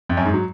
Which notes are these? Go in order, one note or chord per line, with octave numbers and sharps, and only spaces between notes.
F2
F#2
G#2
F#3